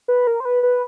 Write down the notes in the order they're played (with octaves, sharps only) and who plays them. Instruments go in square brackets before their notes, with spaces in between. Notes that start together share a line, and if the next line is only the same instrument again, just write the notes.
[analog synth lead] B4
A#4
C5
B4
B4